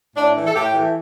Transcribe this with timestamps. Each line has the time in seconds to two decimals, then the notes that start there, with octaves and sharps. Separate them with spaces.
0.15 A2 D4
0.35 E3 A3
0.46 A4
0.55 A2 G4
0.73 E3 A3